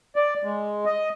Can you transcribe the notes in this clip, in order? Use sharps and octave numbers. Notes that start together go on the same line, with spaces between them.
D5
G#3
D#5